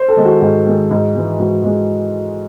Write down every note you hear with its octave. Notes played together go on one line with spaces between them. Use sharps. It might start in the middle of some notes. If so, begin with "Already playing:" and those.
Already playing: C5
A4
D#3 G#3
F#4
G#2 F#4
D#3 G#3
G#2
E3 G#3
G#2 F#4
E3 G#3